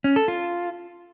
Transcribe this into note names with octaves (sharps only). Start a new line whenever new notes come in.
C#4
A4
F4